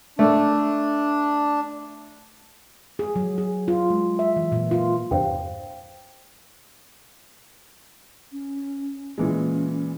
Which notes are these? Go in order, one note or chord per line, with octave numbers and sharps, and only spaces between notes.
A3 D4
G#4
F#3
G#4
F4
G#3
E5
E3
A#2
F4
E2 G2 C3 C5 F5 G5
C#4
A#2 E3 G#3 C#4